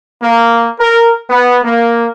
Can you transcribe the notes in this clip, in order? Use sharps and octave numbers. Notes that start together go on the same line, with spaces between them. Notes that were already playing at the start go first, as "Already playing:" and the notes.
A#3
A#4
B3
A#3